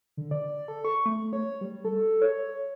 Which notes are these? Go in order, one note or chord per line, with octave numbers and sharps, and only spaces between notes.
D3
D5
A4
C#6
A3
C#5
G3
A4
C#5